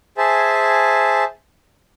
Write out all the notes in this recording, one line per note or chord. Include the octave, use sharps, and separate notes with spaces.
G#4 C5 E5 G#5 A5